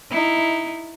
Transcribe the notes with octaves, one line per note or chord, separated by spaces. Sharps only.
D#4 E4